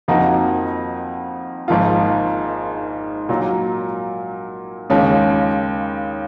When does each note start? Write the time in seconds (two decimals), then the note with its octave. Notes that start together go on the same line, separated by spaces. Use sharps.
0.08 F2 F3 A#3 D#4 F#4
1.68 G#1 G#2 F3 A#3 F4
3.29 A#2 F#3 A#3
4.90 D#2 C#3 G#3 C#4 F4